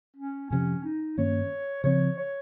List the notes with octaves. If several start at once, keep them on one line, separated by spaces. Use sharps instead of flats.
C#4
F2 C3 F3 C#4
D#4
G2 D#3 A#3 C#4 C#5
C#3 F3 C4 C#5
C#5